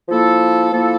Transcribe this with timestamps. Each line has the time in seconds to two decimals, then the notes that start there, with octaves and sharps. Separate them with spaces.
0.09 F3 A#3 E4 A4
0.72 F3 A#3 E4 A4